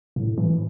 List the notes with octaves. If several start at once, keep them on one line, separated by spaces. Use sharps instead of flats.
A2
E3